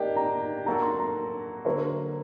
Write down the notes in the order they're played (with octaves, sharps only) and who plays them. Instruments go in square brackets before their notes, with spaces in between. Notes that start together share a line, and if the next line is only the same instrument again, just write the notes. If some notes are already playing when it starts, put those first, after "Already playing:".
Already playing: [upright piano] A#3 D4 G4 [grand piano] D#5 G5
[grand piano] A#5
[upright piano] F#3 A#3 F#4 A4 [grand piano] A#5
[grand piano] C6
A#5
[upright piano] D3 F#3 A#3 [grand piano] C5